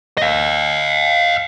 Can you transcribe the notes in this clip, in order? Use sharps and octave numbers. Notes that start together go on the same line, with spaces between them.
D#5 F5